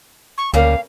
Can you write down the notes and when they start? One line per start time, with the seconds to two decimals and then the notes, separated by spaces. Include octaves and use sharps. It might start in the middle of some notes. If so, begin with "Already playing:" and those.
0.38 C#6
0.54 D2 C#3 G3 A#3 F5